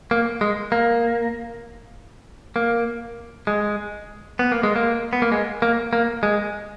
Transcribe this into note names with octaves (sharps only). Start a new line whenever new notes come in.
A#3
G#3
A#3
A#3
G#3
B3
A#3
G#3
A#3
B3
A#3
G#3
A#3
A#3
G#3